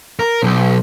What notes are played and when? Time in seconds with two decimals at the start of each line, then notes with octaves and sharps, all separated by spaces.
0.19 A#4
0.43 B1